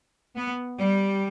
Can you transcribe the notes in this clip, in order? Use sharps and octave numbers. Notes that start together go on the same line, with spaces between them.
B3
G3